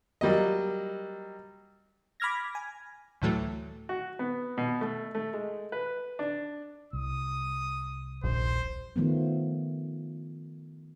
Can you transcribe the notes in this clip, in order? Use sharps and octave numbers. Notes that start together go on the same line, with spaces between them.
F#3 G3 A#3 D#5
B5 D6 F6 G#6 A#6
G#5
D2 A2 E3 F#3 A3
F#4
B3
B2
A3
A3
G#3
B4
D4
C2 D#6
D#1 A#1 C5
D#3 F3 A3 B3